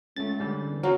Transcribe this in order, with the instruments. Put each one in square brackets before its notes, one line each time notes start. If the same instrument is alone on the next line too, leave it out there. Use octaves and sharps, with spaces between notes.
[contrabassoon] C#2 [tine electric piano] A3 A6
[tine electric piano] D3 G3 C#4
[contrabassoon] E2
[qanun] F#3 [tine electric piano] C#4 F#4 A#4